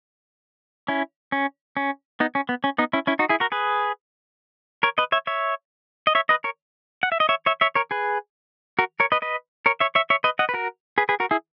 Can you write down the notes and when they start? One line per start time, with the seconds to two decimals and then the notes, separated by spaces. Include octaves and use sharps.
0.88 C#4 E4
1.32 C#4
1.77 C#4
2.20 B3 D#4
2.35 C#4
2.49 B3
2.64 C#4
2.78 B3 D#4
2.93 C#4 E4
3.07 C#4 E4
3.19 D#4 F#4
3.29 E4 G#4
3.40 F#4 A#4
3.52 G#4 B4
4.83 A#4 C#5
4.98 B4 D#5
5.12 C#5 E5
5.27 C#5 E5
6.07 D#5
6.15 C#5 E5
6.29 B4 D#5
6.44 A#4 C#5
7.03 F#5
7.12 E5
7.20 D#5
7.29 C#5 E5
7.46 C#5 E5
7.61 C#5 E5
7.75 A#4 C#5
7.91 G#4 B4
8.79 F#4 A#4
9.00 A#4 C#5
9.12 B4 D#5
9.22 B4 D#5
9.66 A#4 C#5
9.80 C#5 E5
9.95 C#5 E5
10.10 C#5 E5
10.24 B4 D#5
10.39 D#5 F#5
10.49 B4
10.54 F#4 A#4
10.98 G#4 B4
11.09 G#4 B4
11.20 F#4 A#4
11.31 E4 G#4